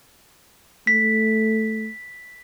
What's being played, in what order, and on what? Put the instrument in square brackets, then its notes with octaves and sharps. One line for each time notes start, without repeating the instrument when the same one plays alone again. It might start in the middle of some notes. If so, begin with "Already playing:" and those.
[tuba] A3 [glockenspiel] B6